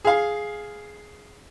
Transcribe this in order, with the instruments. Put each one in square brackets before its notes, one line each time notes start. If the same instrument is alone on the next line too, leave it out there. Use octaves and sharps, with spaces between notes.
[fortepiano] G#4 F5